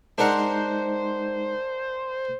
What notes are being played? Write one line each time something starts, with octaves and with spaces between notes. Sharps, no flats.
G#3 D4 D#4 A#4 C5 F#5